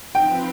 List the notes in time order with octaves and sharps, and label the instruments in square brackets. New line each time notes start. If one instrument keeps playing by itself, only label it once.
[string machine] F3 C4 F4 B4 [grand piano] G5